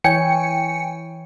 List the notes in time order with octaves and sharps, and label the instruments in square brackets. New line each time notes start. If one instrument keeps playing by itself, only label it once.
[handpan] E3 E4 C#5 [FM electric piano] G5 G#5 C#7